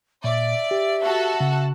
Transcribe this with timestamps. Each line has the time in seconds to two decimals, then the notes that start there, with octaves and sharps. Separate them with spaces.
0.24 A#2 D5 E5
0.71 G4
1.04 F#4 A4 A5
1.40 C#3